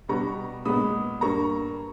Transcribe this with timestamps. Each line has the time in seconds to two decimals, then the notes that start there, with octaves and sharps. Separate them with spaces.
0.08 B2 G3 B3 A#5 C#6
0.65 A#2 G#3 B3 B5 D#6
1.21 G2 G3 A#3 A#5 C#6